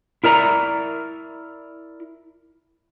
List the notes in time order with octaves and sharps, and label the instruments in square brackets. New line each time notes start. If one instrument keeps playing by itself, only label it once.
[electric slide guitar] E4 A#4 D5 A#5